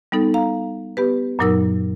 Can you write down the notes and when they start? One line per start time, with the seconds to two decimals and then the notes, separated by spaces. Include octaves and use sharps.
0.12 G3 B3 D#4 A4
0.34 F5 A#5
0.97 B3 G4 B4
1.39 F#2 A#2 F#3 D#4 A#4 E6